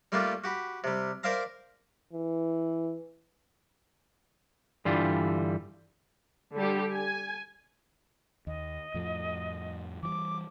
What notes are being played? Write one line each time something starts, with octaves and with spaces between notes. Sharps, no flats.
G3 A3 A#3 D4 F4 G4
F#4 G4 B5
C3 G3
A#4 C5 D5 E5 F5 A#5
E3
G2 D3 E3 G3 F4
D3 G3 G4
G#5
D#2 D#5
F2 A2 F3
E3 F3 G3 D6